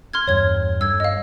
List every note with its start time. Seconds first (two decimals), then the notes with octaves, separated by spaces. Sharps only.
0.13 C6 F6 G#6
0.28 E2 G2 G3 C#5 G#6
0.81 G2 A4 E6 G#6
1.00 D#5 F5